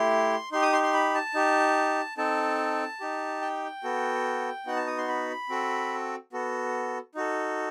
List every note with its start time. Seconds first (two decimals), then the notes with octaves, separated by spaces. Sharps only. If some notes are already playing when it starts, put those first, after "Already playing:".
Already playing: A3 E4 G4 C6
0.52 D#4 G4 C6
0.62 D#6
0.73 C6
0.83 C6
0.93 B5
1.15 A5
1.34 D#4 G4
2.17 C4 D#4 A4 A5
3.00 D#4 G4
3.42 G5
3.83 B3 F#4 A4
4.66 B3 D#4 F#4 F#5
4.76 A5
4.87 D#6
4.98 C6
5.08 B5
5.49 C4 F#4 A4
6.33 B3 F#4 A4
7.15 D#4 F#4 A4